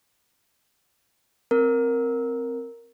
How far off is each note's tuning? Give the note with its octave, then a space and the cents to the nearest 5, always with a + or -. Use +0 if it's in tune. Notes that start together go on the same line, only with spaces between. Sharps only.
C4 +0 A#4 +0